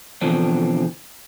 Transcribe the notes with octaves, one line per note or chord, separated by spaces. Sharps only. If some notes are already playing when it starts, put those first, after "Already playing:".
B2 D3 E3 F3 C4 D4